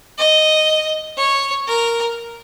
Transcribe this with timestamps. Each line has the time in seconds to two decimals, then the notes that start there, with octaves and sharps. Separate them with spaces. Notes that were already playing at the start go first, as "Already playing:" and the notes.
0.18 D#5
1.17 C#5
1.67 A#4